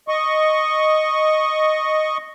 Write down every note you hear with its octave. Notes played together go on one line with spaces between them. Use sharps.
D#5 C#6